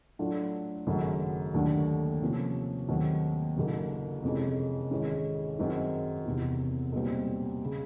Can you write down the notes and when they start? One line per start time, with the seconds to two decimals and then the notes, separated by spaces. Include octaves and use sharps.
0.19 A2 F#3 A3 D4 F4
0.87 G#1 F#2 C#3 F#3 A3
1.54 D#2 D3 F#3 A3 D4
2.21 C3 F3 A#3 C#4
2.89 D#2 D#3 F#3 A3 C4
3.56 F#1 F#2 D3
4.23 F2 C3 E3 G#3 C#4
4.91 G#1 G#2 E3 G#3 C#4
5.58 F#2 D#3 G#3 C4 D#4
6.26 E2 C3 E3
6.92 B1 A#2 G3 C4
7.65 C#3